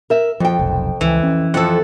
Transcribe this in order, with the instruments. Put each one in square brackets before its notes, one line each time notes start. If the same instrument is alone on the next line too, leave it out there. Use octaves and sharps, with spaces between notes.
[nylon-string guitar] A#4 E5
[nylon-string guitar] F2 G5 [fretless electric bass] F3
[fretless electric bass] F1 B1
[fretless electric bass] C#2 [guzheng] E3
[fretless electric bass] C#4
[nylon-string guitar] F2 F3 [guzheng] A4 F#5